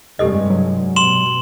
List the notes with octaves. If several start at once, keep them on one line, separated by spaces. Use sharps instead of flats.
F1 G2 G#3 G4 A4 D#5
F#3
B2 C6 E7 F#7